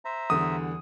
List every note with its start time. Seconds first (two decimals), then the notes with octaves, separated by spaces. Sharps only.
0.05 C5 E5 A#5
0.30 E2 D3 G3 D#6